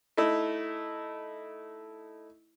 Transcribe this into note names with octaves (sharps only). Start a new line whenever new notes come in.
A3 D#4 E4